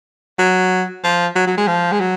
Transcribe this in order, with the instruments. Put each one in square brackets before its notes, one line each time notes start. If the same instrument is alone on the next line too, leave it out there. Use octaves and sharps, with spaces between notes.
[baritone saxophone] F#3
F3
F#3
F#3
G#3
F3
G#3
F#3